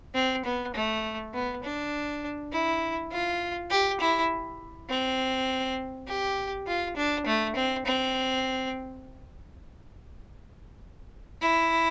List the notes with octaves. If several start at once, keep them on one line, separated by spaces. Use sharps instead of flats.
C4
B3
A3
B3
D4
E4
F4
G4
E4
C4
G4
F4
D4
A3
C4
C4
E4